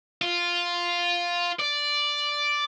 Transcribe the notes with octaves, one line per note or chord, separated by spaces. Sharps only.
F4
D5